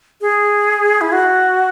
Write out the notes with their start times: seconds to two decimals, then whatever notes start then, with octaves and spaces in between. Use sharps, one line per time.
0.21 G#4
1.01 E4
1.12 F#4